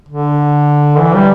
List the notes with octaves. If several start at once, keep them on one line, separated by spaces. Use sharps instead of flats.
D3
E3
G3